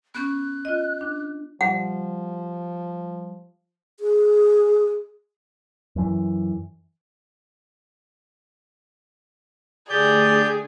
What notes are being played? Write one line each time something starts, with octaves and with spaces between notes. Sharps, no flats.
B3 C#4 F#6
F4 D#5
D4
F3 G3 F#5
G#4
F#2 E3
D3 A3 G4 G#4 D5 G6